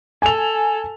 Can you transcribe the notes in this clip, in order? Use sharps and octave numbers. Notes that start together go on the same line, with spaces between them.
A4 G#5 F7